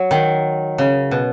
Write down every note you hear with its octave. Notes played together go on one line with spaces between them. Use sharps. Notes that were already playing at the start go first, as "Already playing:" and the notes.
Already playing: F#3
D#3
C#3
B2